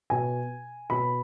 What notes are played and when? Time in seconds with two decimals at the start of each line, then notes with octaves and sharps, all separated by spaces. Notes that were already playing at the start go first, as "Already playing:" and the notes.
0.10 B2 G#5
0.90 B2 B5